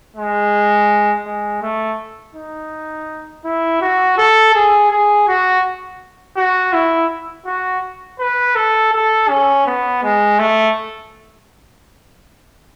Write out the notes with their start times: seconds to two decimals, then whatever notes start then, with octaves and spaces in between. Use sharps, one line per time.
0.16 G#3
1.25 G#3
1.62 A3
2.35 D#4
3.44 E4
3.81 F#4
4.18 A4
4.54 G#4
4.91 G#4
5.28 F#4
6.37 F#4
6.73 E4
7.46 F#4
8.19 B4
8.56 A4
8.93 A4
9.29 C#4
9.66 B3
10.03 G#3
10.39 A3